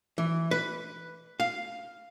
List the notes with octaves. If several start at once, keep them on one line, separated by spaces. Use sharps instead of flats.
E3
B4
F5